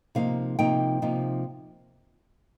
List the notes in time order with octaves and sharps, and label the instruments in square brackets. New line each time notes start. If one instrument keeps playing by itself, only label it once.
[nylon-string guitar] C3 F3 A#3 D#4 F5
C3 F3 A#3 D#4 G5
C3 F3 A#3 D#4